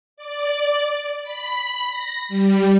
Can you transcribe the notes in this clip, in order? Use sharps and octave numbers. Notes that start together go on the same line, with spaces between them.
D5
B5
A#6
G3